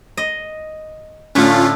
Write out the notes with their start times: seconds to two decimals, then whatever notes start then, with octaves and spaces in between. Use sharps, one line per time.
0.17 D#5
1.35 A2 D3 A3 C#4 F4